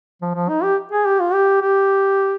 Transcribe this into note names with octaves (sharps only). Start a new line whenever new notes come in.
F3
F3
D#4
G4
G#4
G4
F4
G4
G4